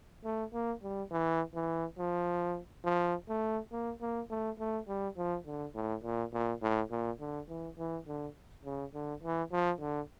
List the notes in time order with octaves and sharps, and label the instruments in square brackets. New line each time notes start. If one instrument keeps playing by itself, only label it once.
[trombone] A3
A#3
G3
E3
E3
F3
F3
A3
A#3
A#3
A3
A3
G3
F3
D3
A2
A#2
A#2
A2
A#2
D3
E3
E3
D3
C#3
D3
E3
F3
D3